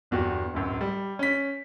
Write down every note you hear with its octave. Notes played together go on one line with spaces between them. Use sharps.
G1 E2 F#4 G4
D1 F#2
G3
C#4 B6